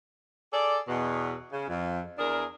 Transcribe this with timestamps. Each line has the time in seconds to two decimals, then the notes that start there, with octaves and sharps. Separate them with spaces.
0.53 G#4 A4 D5
0.88 E2 B2
1.51 C#3
1.69 F2
2.18 E2 D4 G#4 A#4